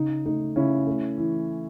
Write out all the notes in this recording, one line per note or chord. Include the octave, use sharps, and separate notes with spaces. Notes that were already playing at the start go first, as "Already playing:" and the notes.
Already playing: C#3 D#4
A3 D#4
C#3 C#4 E4
A3
E3